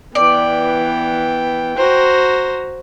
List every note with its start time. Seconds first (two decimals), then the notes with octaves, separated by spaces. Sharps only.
0.15 E3 B3 D5 G5
1.77 F#4 C5 A#5